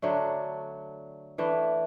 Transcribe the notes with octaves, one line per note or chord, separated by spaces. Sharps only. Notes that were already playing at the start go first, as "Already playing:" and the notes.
D3 F#3 A3 D4
E3 A3 D4